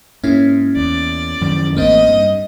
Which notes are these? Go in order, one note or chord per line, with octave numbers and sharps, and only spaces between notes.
G#2 A#3 C#4 E4
E2 D5
F#2 D#3 F3
A1 A#3 C4 D#5
G2